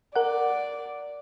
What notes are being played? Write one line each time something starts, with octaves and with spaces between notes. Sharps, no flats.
A#4 D5 F#5